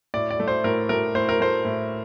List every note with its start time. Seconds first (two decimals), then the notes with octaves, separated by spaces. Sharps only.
0.14 A2 D5
0.30 D5
0.40 A3
0.48 C5
0.64 A2 A#4
0.89 A3 A#4
1.15 A2 C5
1.29 A#4
1.40 A3 C5
1.65 A2